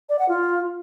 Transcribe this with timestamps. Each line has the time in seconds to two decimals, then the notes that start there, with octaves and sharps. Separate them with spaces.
0.09 D5
0.19 F#5
0.29 F4